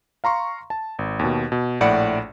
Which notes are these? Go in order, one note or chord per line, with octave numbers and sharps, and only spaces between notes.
F5 A#5 C6 C#6
A5
G#1
D#2 B2
B2
A#1 A2 D5 F#5 B5 C#7